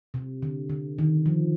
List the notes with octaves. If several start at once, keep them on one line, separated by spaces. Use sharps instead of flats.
C3
D3
D3
D#3
F3